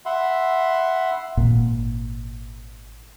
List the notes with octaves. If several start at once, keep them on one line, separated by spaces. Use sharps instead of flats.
E5 F#5 B5 C6
G#1 A#2